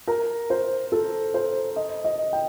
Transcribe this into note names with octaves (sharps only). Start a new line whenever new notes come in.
A#4
C5
A4
C5
D#5
D#5
G5